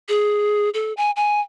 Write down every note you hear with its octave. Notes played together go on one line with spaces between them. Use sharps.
G#4
A4
G#5
G#5